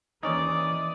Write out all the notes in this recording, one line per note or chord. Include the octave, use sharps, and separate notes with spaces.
D#2 E3 C#4 D#4 D5 D#6